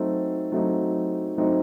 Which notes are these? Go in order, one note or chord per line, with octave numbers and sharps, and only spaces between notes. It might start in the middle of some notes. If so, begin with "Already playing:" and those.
Already playing: F#3 A3 C4 D#4
F#3 A3 C4 D#4
F#3 A3 C4 D#4